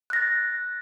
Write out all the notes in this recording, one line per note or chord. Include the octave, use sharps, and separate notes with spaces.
F#6 A6 A#6